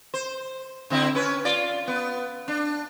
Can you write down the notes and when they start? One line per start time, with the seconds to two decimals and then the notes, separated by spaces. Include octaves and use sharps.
0.14 C5
0.90 D3 C4 E4
1.15 C#4 B4
1.45 F4 D5
1.88 B3
2.48 D4